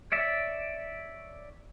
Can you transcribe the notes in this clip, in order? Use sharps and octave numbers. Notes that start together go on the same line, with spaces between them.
C#5 D5 E5